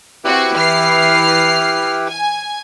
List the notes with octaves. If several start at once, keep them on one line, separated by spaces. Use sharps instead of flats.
C4 E4 F#4 G4 B4
E3 F6 C7
G#5